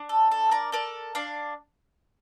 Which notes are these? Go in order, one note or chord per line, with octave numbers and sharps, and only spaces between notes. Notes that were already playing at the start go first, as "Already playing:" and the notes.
Already playing: D4
A4
A4
A#4 D5
A4 A#4 D5
D4 D5 F5